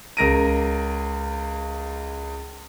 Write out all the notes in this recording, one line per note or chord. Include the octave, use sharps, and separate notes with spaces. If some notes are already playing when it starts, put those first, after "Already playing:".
C#2 A#4 A#6 D7 D#7